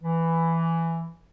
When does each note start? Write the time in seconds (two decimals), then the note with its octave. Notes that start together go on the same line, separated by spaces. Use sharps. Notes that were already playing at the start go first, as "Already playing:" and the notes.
0.03 E3